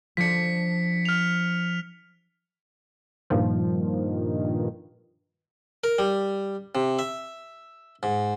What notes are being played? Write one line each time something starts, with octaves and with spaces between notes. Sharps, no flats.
F3 D4 B6 C#7
F6 F7
G2 A#2 D#3 F3
A#4
G3
C3
E5
G#2